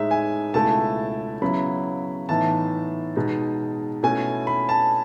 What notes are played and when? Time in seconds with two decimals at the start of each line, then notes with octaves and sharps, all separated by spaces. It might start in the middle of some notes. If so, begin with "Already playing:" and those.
Already playing: A2 G#3 D#4 E5
0.11 G#5
0.54 C#2 B2 A3 E4 A5
1.42 C#3 F#3 B3 E4 B5
2.29 A2 E3 B3 D#4 A5
3.16 B2 G#3 D#4
4.03 B2 A3 C#4 E4 G#5
4.47 B5
4.69 A5